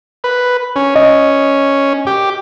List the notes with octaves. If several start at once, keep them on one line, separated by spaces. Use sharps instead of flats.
B4
C#4
C#4 D#5
G4